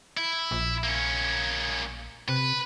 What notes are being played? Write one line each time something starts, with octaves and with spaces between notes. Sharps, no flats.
E4
A#1
A#3 C#4
C3 B4